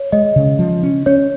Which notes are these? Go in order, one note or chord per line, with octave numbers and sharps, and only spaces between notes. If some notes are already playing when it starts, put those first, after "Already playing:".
Already playing: C#5
G#3 D#5
C#3
F3
C#4
C#4 C#5